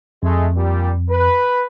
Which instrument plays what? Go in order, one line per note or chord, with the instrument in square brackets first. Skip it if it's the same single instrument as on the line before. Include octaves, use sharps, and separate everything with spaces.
[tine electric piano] F2 [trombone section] G#3 A3
[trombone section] A#2 G3
B4